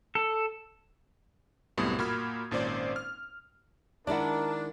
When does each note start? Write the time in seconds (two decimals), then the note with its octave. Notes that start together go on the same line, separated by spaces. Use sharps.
0.15 A4
1.77 C2 F#2 A2 G3 B3 D#6
1.98 A#2 A#3 F#4 B5 F6 G#6
2.51 G#1 A#2 C#4 C5 D5
2.96 F6
4.07 D#3 G#3 D4 E4 A#4 D5 F#5